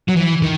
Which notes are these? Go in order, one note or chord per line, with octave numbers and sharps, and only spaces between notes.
F#3
E3
D#3